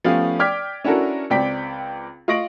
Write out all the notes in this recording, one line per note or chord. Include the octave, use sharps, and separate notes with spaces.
F3 A3 B3 C#4 G4 F5
D5 G5 D6 F6 G#6 B6
C#4 D4 E4 F#4 A4 A#4
C#2 C4 D5 G5 B6
F4 D#5 C#6 A#6 D7 F#7